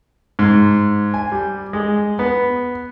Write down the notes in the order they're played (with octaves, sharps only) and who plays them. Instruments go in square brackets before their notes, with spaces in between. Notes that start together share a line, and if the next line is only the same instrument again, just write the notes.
[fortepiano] G#2
G#5
G3
G#3
B3